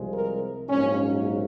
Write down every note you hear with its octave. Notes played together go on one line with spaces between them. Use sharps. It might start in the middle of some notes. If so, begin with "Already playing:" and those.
Already playing: C2 C3 F3 G#3
A#4
A#1 G#2 F#3 A#3 C#4